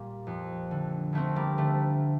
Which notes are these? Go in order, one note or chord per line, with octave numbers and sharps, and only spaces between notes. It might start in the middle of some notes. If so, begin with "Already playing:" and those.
Already playing: A#2 G3 A#3
F2
D3
D2 A3 C4
G3 A#3
D3 A3